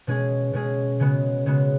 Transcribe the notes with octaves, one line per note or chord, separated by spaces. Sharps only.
B2 G#3 C#4 G#4
B2 G#3 C#4 G#4
C#3 G#3 B3 F#4
C#3 G#3 B3 F#4